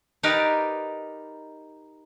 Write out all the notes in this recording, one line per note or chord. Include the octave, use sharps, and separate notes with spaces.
D#4 G4 A#4 B4 D5